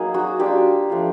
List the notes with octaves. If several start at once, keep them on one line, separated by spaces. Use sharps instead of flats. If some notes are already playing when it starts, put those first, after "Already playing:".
Already playing: F#3 A#3 D#4 G#4
F#4
A#3 D4 F4 G4
F3 A3 D4 F4